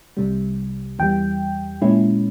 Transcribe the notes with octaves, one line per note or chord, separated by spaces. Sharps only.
C2 C3 G3
E2 E3 G3 G5
A#2 G#3 C#4 E4